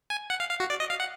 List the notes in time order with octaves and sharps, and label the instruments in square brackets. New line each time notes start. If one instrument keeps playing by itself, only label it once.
[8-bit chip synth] G#5
F#5
F5
F5
F#4
D5
D#5
F5
F#5